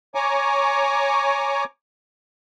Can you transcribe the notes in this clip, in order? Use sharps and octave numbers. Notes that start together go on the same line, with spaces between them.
C#5 G#5 A#5 C#6 D6